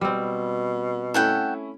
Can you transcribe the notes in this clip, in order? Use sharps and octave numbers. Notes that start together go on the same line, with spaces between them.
B2 G3 C4
A3 C#4 E4 A4 F#5 G5